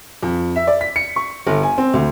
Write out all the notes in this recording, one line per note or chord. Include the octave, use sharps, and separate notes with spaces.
F2
E5
D5
B6
C#7
C#6
G1
G#5
C4
D2